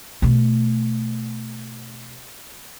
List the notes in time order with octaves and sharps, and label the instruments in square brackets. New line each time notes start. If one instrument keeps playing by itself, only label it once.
[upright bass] B2 A3